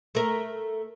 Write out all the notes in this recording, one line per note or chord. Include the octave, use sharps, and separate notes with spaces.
A3 A#4